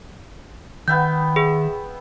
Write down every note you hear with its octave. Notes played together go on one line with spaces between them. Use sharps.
D#3 B3 E5 G5 G6
G#4 E5